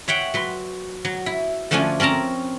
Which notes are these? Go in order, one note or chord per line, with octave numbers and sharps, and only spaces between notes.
C#5 E5 F#5 G5
F#3 B4 C6
F#3
E4
D3 F3 A3 C#4 D4 G#5
C4 C#4 A#4 A5 A#5